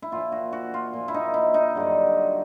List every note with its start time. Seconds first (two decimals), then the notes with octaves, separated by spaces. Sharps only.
0.02 E4
0.12 A#2 F3 F4
0.32 F#4
0.53 F#4
0.74 F4
0.93 A#2 F3
1.08 E4
1.14 D#4
1.34 E4
1.54 D#4
1.75 G2 D3 F#3